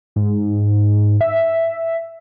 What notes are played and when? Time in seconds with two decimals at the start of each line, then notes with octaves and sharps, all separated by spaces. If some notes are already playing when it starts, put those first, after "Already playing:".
0.16 G#2
1.21 E5